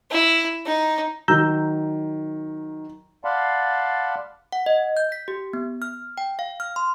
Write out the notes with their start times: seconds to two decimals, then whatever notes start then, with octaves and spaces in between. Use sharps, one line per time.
0.11 E4
0.66 D#4
1.28 D#3 F#3 A#5 E6 G6
3.25 D5 F5 F#5 A5 B5 C6
4.52 F#5
4.66 D#5
4.97 G6
5.12 B6
5.28 G4
5.53 B3
5.82 F6
6.18 G5
6.39 F5
6.60 F6
6.76 C6